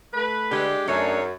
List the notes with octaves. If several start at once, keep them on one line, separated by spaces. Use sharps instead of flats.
A3 B4
D3 G#3 G4
F#2 A3 D4 D#4 G#4 C#5